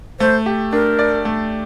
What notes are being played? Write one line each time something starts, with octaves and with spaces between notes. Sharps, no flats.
A3 C5
G4
D4 A#4
D5
A3